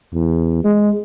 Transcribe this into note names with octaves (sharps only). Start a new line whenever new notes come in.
E2
G#3